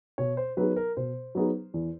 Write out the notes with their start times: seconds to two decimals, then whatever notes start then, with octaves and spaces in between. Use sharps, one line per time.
0.18 B2 C#5
0.37 C5
0.57 F#3 B3 D#4 G#4 B4
0.76 A#4
0.97 B2 C5
1.35 F#3 B3 D#4 G#4
1.74 E2